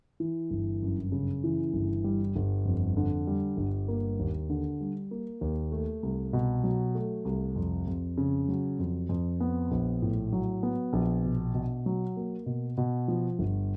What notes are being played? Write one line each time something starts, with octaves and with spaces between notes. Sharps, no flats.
E3
G1
F#2
C#3
E3
G1
G3
G1
F2
D3
G3
G1
A#3
D#2
D3
G3
A#3
D#2
A3
C2
B2
F#3
A3
C2
F2
F2
C#3
F#3
F2
F2
B3
A#1
A2
F#3
B3
A#1
B2
B2
F#3
A#3
B2
B2
F3
G1